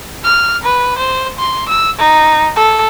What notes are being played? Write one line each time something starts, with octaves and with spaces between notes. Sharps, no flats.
F6
B4
C5
C6
E6
D#4
A4